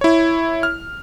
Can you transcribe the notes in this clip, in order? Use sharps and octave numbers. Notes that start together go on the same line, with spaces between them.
E4 C#5
F6